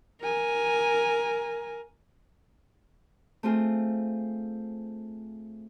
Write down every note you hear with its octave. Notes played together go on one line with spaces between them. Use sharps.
A#4 G#5
A3 C4 F4 G#4